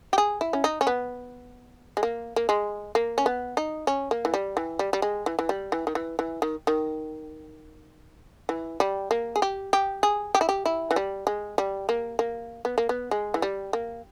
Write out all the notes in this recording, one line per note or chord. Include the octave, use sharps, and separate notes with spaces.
G4
G#4
E4
C#4
D#4
C#4
B3
G#3
A#3
A#3
G#3
A#3
C#4
B3
D#4
C#4
A#3
E3
G3
E3
G3
G3
G#3
E3
E3
G3
E3
D#3
E3
E3
D#3
D#3
E3
G3
A#3
G#4
G4
G4
G#4
G4
E4
G4
E4
E3
G3
G#3
G3
A#3
A#3
B3
A#3
B3
G#3
E3
G3
A#3